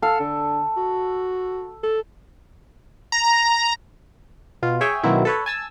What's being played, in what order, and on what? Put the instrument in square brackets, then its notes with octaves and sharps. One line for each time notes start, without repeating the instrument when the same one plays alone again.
[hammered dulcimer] A4 [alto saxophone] F5
[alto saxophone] D3
F#4
A4
[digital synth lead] A#5
[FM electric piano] B2 F4
G#4 C#5 E5 G5 G#5
B2 D#3 F#3 A#3 C4 E4
A4 B4 C#5
G#5 A5 E6